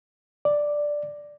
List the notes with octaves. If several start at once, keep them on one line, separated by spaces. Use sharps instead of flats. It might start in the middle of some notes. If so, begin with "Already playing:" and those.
D5